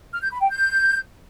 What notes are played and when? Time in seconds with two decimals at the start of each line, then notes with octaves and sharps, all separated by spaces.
0.13 F6
0.22 G6
0.31 B5
0.40 G5
0.49 G6